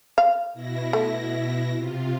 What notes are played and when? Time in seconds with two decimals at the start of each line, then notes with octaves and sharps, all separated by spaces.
0.18 F5
0.54 B2 E4 A#6
0.93 A3
1.75 C3 F4